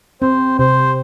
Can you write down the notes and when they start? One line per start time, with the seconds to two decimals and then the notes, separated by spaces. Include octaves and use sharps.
0.22 C4 C5
0.59 C3 C5